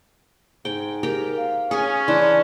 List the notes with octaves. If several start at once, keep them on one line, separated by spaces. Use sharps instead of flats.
G#2 G5
G4 A#4 G5 A#5
F5
C#4 G#4 G#5
E3 D4 C6